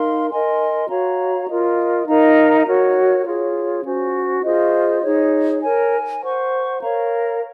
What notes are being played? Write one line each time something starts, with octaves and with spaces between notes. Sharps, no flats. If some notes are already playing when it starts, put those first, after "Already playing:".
Already playing: D#4 A#4 F5 C6
A#4 D#5 G#5 C6
F#4 C#5 F5 A#5
F4 A#4 D#5
D#4 A#4 F5 A#5
F#4 A#4 C#5
F4 G#4 C#5
C#4 F#4 C5
F4 G#4 C5 D#5
D#4 G#4 C#5
A#4 C#5 G#5
C5 F#5 C#6
A#4 C#5 F5 A#5